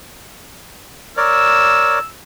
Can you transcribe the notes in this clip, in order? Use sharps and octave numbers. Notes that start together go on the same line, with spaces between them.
A#4 C#5 D5 E6